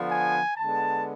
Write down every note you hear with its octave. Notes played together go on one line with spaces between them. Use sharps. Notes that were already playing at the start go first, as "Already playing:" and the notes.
Already playing: D3 F3 B3
G#5
D3 G#3 B3 A5